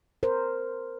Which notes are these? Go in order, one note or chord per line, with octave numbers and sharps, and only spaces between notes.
A#4 C5